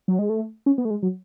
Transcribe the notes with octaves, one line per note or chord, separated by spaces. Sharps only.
F#3
G#3
A3
C#4
B3
A3
G#3
F#3